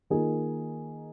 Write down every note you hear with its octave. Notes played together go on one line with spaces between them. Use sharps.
D#3 A#3 F4 G#4